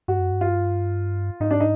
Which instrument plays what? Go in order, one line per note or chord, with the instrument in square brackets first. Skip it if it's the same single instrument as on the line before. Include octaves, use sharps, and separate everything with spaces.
[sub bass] G2 [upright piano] F#4
[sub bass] F#2
G2
[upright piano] F4
[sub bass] G#2 [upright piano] D#4
[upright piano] D4
D#4